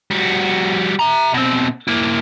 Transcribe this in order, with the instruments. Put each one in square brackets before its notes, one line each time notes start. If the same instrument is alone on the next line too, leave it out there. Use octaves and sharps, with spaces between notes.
[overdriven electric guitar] G3 F#4
E5 A#5
B2 C4
A#3 E4